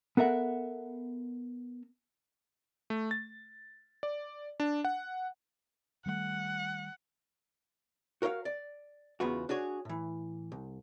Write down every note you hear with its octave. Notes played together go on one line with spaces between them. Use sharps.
B3 A4 A#4 E5 F#5
A3
A6
D5
D4
F#5
D#3 G3 A3 F#5
F#4 A#4 C#5 D#5 F5
D5
E2 C#3 B3 F4 F#4
D4 F#4 G#4 C#5
A2 E3
C2